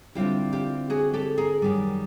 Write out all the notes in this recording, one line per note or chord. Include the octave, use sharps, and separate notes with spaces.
D3 G3 C4 E4 F4 G4
F4 G4
F#4 G#4
G4 A4
G#4 A#4
F#2 D#3 G3